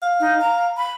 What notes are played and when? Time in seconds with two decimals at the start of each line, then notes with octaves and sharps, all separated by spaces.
0.02 F5
0.20 D#4
0.41 A#5
0.77 B5